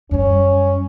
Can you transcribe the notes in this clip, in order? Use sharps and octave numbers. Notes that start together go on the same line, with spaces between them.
F#2 G3 C#4